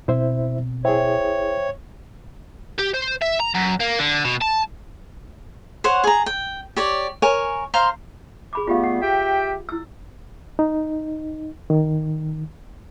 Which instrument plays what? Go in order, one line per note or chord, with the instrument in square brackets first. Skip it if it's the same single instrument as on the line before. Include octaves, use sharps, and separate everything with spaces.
[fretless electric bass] B2 C4 [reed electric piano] E4 C5 E5
[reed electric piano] E4 G#4 [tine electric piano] C5 E5 G5 [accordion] C#5
[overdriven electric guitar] G4
C5
E5
A#5
F#2
A#3
D3
B2
A5
[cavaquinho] C5 C#5 F#5
G#4 A#5
G5
G4 C#5 D5
A#4 C#5 G#5
C5 F5 A#5 C6
[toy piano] G#4 B5 D6
[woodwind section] G3 A3 B3 [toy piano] F4 G4 F5
[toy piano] F#5
[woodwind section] G4 E5 G5
[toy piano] E4 E6
[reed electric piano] D#4
D#3